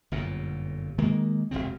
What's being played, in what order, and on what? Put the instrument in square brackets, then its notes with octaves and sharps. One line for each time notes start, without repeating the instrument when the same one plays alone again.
[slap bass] G1 F#2 A#2
D#3 G#3 A#3
E1 C#2 C#3 C4